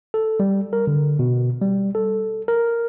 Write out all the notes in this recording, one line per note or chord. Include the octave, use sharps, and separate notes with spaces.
A4
G3
A#4
D3
B2
G3
A4
A#4